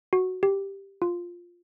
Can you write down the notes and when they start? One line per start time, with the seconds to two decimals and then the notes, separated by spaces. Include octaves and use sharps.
0.13 F#4
0.43 G4
1.02 F4